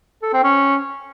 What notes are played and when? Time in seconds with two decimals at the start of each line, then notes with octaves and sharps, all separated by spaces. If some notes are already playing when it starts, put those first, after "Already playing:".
0.23 A4
0.33 C4
0.44 C#4